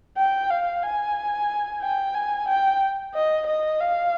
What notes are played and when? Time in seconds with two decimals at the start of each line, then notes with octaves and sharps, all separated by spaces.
0.17 G5
0.50 F5
0.83 G#5
1.82 G5
2.14 G#5
2.48 G5
3.14 D#5
3.47 D#5
3.80 F5